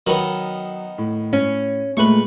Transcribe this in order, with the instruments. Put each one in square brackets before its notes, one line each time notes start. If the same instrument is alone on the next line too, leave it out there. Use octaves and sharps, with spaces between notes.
[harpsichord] D#3 B3 [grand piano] F#3
[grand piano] A2
[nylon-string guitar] C#4
[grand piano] A#2 G#3 [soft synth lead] A3 [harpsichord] B4 C#6